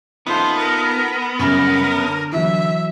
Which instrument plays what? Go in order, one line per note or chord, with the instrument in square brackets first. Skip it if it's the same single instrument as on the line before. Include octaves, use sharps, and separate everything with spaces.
[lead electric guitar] B3 [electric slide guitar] D#4 F4 A4 [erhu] C5
[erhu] A#4
[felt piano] F#2 [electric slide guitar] C#3 G3 [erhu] A#4
[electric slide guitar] D3
[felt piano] E3 F#3 [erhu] E5